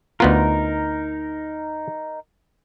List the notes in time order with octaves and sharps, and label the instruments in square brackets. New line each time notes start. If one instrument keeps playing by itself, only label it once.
[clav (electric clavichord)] D2 B3 F4 [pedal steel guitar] D#4 A#4